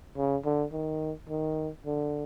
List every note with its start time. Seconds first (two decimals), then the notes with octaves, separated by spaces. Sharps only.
0.17 C#3
0.45 D3
0.72 D#3
1.29 D#3
1.86 D3